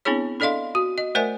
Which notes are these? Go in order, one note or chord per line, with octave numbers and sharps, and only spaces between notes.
B3 C4 D4 E4 G#4 C#5
D4 A4 D5 D#5 F5 C6
F#4
D#5
A3 A#4 C5 D5 E5 G#5